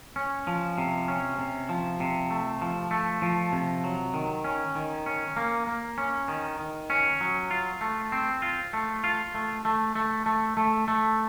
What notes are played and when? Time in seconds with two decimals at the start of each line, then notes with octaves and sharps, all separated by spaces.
0.16 C#4
0.47 F3
0.78 C3
1.08 C#4
1.39 C3
1.69 F3
2.00 C3
2.30 A3
2.62 F3
2.91 A3
3.22 F3
3.52 C3
3.84 F#3
4.14 D#3
4.44 C#4
4.75 D#3
5.06 C#4
5.36 A#3
5.67 A#3
5.98 C#4
6.28 D#3
6.59 D#3
6.90 C#4
7.21 F#3
7.51 F4
7.81 A3
8.12 C4
8.42 F4
8.73 A3
9.04 F4
9.34 A3
9.65 A3
9.95 A3
10.26 A3
10.57 A3
10.88 A3